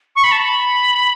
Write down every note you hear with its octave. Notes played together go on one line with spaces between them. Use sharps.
C#6
B5
A5
B5